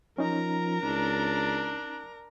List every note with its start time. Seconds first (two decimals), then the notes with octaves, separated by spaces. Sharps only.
0.18 F3 C#4 D#4 A#4 A#5
0.83 C#2 D4